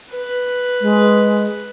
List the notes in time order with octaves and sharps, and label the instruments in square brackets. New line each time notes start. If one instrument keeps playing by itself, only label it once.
[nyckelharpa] B4
[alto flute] G#3